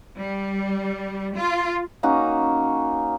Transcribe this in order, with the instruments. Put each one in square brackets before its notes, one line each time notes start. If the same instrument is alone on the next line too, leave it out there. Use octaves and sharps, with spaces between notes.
[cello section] G3
F4
[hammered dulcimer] A#3 C#4 D#4 F#4